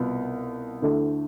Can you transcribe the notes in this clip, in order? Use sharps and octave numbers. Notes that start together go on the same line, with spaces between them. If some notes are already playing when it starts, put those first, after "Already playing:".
Already playing: C2 B2 B3 F4
D2 D3 A3 E4